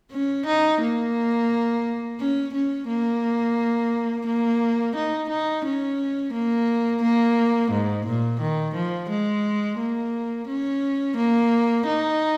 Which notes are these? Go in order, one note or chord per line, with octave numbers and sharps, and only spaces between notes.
C#4
D#4
A#3
C#4
C#4
A#3
A#3
D#4
D#4
C#4
A#3
A#3
G#2
A#2
D#3
F3
G#3
A#3
C#4
A#3
D#4